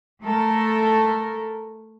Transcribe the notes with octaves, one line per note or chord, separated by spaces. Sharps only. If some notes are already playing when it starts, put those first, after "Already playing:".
A3 A4 A#4